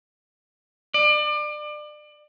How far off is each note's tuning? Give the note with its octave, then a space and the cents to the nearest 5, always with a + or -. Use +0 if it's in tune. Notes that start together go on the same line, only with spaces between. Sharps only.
D5 +30